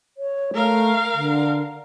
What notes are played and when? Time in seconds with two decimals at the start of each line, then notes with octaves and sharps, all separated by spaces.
0.17 C#5
0.54 A3 A#4 F5
1.14 D3